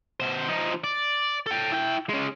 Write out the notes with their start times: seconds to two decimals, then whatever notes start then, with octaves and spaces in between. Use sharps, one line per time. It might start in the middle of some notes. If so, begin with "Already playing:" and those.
0.20 B2 C5
0.49 F3 D#4
0.84 D5
1.47 A4 G5
1.72 E4 G5
2.09 G#3 C#4